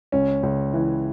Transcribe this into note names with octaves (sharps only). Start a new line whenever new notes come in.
C#2 C#4
C#2
E3